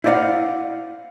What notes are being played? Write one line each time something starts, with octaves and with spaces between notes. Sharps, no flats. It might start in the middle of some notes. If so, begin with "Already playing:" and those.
E4 C5 D5 D#5 F5 F#5